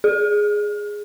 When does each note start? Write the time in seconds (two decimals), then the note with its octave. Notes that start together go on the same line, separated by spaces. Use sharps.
0.04 G#4